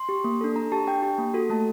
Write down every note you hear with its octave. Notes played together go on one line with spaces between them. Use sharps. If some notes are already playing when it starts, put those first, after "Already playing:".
Already playing: C6
G4
A#3
D4 A4
D4 A#5
G4 A5
D4 G5
G4
A#3
F#4 A4
A3 A5